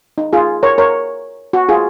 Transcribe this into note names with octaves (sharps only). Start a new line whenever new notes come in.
D#4
F4 G#4
A#4 C#5
A#4 C#5
F#4
F4 G#4